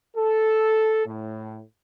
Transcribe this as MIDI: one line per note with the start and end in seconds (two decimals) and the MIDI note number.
0.17 1.03 69
1.06 1.60 45